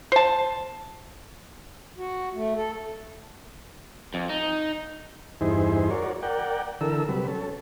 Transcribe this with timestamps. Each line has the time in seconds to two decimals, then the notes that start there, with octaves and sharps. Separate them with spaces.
0.12 C5 A5
1.98 F#4
2.34 A3
2.56 A4
4.14 F2
4.30 D#4
5.41 E2 G2 D#4 E4 G#4 C5
5.91 F#4 A#4 C#5 D5
6.23 A#4 D5 F#5 G5
6.81 D3 E3 A4 A#4 E6
7.09 C3 F#3 G3 B4
7.28 C#4 A4